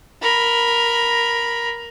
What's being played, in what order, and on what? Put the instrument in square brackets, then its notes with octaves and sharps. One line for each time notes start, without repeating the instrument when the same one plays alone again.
[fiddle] A#4 B5